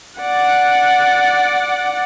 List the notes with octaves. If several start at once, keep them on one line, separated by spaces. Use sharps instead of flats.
D5 F#5